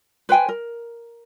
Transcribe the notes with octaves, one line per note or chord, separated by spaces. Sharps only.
B4 C5 G5 G#5
A#4